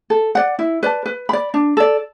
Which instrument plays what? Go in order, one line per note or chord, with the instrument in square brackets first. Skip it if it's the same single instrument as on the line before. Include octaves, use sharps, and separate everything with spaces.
[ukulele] A4
D5 F#5
E4
B4 D5 A5
B4
D5 B5
D4
A4 D5